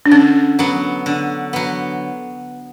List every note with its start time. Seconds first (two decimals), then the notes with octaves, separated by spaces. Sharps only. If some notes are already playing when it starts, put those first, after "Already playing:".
0.06 D4
0.11 D3 C#4
0.59 F#3 B3
1.06 D3
1.53 F#3 B3